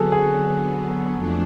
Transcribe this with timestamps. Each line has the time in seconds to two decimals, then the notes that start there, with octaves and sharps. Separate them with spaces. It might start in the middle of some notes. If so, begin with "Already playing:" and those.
Already playing: D3 F#3 B3 F#4 G#4 A4
0.12 G#4
1.14 F2 F3 A3 D4